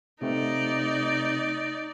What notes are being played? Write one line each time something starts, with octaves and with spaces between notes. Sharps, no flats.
C3 A3 C4 D#4 D5